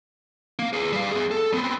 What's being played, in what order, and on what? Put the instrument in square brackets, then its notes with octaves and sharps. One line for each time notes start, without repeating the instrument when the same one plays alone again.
[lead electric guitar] A#3 F5
G#4 B4
G3 F5
B3 G#4
A4
B3 C4